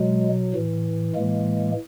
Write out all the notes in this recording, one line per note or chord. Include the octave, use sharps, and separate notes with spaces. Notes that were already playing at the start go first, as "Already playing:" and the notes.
Already playing: B2 F#3 G#3
A2 E3
A2 E3 G#3 A#3